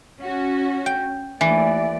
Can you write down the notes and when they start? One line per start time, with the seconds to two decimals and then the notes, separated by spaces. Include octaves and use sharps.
0.19 C#4 F#4
0.86 G5
1.41 D#2 E3 A3 D5